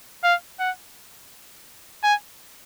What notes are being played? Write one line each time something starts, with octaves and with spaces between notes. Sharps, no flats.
F5
F#5
G#5